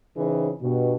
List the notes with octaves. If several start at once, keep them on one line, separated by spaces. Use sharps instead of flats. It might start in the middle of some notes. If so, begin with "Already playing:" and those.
C#3 E3 C4 D#4 G#4
G2 B2